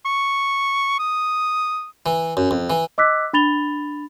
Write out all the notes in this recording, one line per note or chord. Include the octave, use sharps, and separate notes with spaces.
C#6
D#6
E3
F#2
F2
E3
D#5 D6 E6 F#6 B6
D4 B5 A6 F7 G7